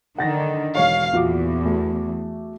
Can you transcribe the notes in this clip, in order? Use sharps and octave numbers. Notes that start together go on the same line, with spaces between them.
D3 D#3 F#5 A6 A#6
E1 C#5 F5 C#6
E2 A#2 F#4 D6
A3 F#4